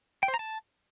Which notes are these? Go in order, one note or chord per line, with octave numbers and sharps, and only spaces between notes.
G5
C5
A#5
A5